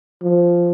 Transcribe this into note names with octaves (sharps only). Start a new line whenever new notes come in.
F3